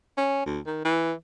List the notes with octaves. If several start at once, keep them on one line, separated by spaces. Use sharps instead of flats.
C#4
D2
D#3
E3